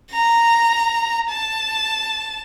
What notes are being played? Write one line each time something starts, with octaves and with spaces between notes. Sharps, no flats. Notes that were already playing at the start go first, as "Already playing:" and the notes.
A#5
A5